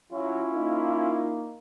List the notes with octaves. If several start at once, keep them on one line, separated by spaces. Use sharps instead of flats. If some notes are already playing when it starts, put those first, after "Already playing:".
F#3 C#4 E4 F4
A#3 D#4